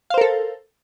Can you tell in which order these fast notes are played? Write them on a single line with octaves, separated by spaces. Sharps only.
F5 C5 A#4 A4